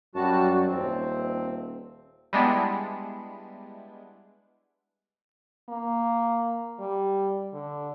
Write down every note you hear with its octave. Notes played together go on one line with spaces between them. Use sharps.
F#2 G3 F#4 A5
D#1 C4
G3 G#3 B3 D4 E4
A#3
G3
D3